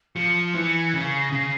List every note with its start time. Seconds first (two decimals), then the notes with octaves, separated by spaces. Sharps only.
0.16 F3 C#7
0.55 E3
0.94 C#3 C#7
1.07 C7
1.21 A#6
1.32 C#3 C7